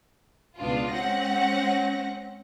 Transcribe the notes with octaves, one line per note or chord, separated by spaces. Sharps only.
C#2 B2 B3 D4 F4
G#3 C4 C#4 F#5 A#6